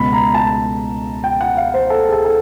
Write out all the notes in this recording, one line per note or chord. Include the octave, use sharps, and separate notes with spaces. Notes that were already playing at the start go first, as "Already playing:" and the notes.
Already playing: C#2 B2 B5
A#5
A5
G5
F#5
F5
C5
A4
G#4
A4
A4